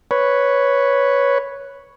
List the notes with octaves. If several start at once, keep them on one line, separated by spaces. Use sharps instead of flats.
B4 C#5